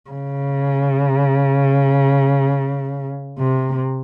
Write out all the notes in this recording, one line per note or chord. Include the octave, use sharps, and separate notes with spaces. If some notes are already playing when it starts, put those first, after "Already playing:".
C#3
C3